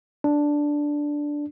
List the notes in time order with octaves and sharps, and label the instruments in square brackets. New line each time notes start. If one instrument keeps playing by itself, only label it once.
[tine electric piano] D4